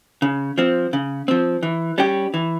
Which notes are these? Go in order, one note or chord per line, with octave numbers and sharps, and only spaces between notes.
C#3
F3 C4
C#3
F3 C4
E3
G3 C#4 G4
E3